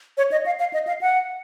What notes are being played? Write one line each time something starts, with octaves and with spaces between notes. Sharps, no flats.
C#5
D#5
F5
F5
D#5
F5
F#5